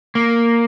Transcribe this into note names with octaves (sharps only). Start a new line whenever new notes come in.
A#3